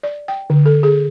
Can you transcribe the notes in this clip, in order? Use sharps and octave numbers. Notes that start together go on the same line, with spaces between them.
D5
G5
D3
A4
G#4